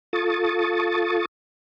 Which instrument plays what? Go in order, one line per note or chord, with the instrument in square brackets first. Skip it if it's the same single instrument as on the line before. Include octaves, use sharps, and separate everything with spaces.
[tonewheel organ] F4 A4 C#6 D#6 A6